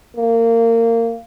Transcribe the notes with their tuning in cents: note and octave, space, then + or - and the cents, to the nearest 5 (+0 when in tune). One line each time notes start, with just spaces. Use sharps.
A#3 -25